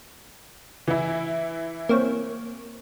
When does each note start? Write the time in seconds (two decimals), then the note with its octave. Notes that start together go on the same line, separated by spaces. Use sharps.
0.87 E3 E4
1.89 A#3 C4 C#5